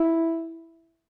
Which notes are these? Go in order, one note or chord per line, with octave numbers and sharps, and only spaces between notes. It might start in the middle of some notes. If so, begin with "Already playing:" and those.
Already playing: E4